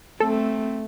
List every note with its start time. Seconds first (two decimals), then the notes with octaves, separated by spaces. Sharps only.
0.20 A3 C4 A4